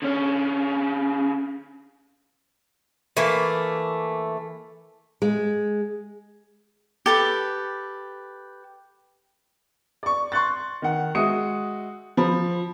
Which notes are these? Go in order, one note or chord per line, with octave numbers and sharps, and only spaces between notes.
D3 C#4
E3 A3 A#3
G#3
G4 A4 B4
D5 C#6
C6 C#6 F#6 A6
D#3 F#5
G#3 F#4 E5 D#6 C#7
F3 B5